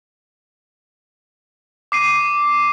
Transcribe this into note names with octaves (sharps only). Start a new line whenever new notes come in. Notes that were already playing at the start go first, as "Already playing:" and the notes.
D6 C7 D#7